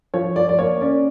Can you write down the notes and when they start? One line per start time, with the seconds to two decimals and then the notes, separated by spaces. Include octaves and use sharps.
0.14 F3 C#5
0.36 F3 D5
0.49 D5
0.58 A#3 C#5
0.81 C#4 D5